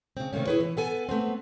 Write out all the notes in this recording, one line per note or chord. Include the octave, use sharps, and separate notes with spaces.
C#3 C4
C3 D#3 A3 A#3 C#4
E4 G#4 B4 C#5
E3
B3 A4 G#5
A3 B3 C4